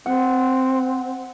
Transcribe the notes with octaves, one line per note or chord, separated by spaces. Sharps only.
C4 F#5